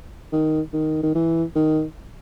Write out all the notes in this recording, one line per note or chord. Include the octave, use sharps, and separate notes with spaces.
D#3
D#3
D#3
E3
D#3